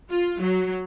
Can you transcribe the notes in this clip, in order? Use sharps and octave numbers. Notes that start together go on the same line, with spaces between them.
F4
F#3